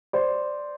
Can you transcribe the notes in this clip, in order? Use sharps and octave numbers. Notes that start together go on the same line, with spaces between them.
C5 D5